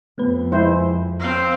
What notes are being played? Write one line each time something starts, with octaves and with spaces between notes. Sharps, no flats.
F2 A3 B3 B4
G#3 E4 C5
C4 F5